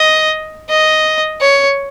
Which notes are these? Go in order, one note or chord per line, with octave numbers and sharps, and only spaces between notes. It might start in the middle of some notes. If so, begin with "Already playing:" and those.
Already playing: D#5
D#5
C#5